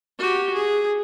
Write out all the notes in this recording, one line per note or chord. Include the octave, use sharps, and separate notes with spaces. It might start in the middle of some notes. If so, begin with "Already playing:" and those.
F#4 G4
G#4